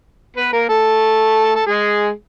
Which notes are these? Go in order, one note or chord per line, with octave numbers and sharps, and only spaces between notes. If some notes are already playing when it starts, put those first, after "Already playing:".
B3 B4
A#3 A#4
A3 A4
A4
G#3 G#4